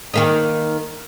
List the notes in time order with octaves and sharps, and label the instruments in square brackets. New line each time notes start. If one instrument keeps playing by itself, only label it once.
[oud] D#3 A#3 D#4